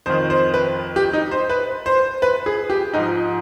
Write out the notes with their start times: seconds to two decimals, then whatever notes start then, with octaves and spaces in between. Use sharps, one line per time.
0.06 F2 D#3 C5
0.30 C5
0.54 B4
0.96 G4
1.13 D#4
1.31 C5
1.50 B4
1.86 C5
2.22 B4
2.46 G#4
2.70 G4
2.93 G#2 F3 D#4